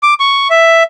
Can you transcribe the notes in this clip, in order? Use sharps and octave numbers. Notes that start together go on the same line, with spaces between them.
D6
C#6
E5